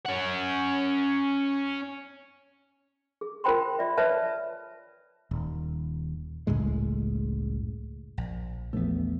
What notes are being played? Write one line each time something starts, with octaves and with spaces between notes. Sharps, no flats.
C#4 F#5
G#4
F4 A#4 C5 G5 B5 C6
F4 D5 E5
B4 C#5 D5 E5 A5
D#1
F#1 C#2 A2 G#3
A#1
A#1 E2 A3 B3